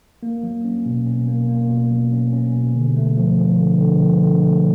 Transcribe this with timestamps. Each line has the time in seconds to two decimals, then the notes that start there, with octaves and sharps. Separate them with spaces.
0.23 A#3
0.43 F#3
0.65 C#4
0.86 B2
1.06 C#4
1.28 A#3
1.49 A#3
1.69 B2
1.91 F#3
2.12 C#4
2.33 C#4
2.54 B2
2.75 D3
2.96 A3
3.17 F3
3.38 F3
3.60 D3
3.80 D3
4.02 F3
4.23 D3
4.44 A3